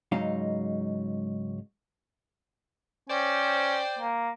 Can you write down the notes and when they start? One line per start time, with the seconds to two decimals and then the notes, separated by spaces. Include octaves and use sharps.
0.12 C#2 G#2 F#3 D#4 F5
3.10 C#4 C5 D5 G5
3.99 A#3